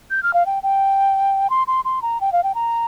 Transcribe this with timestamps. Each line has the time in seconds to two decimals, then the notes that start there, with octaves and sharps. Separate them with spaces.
0.10 G6
0.23 F6
0.33 F5
0.46 G5
0.63 G5
1.50 C6
1.67 C6
1.85 C6
2.02 A#5
2.21 G5
2.32 F5
2.43 G5
2.55 A#5